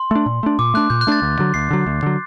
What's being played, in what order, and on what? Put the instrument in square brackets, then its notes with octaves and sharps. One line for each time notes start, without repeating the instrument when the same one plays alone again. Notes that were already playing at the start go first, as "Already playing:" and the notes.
Already playing: [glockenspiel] C6
[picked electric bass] A3 D4
A#2
A3 D4
[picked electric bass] A#2 [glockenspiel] D6
[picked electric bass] A3 D4 [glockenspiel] F#6
[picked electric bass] A#2 [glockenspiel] G6
[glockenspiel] F#6
[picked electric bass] A3 D4 [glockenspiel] A6
[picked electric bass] D2
D3 F#3
[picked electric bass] D2 [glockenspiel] C7
[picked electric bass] D3 F#3
D2
D3 F#3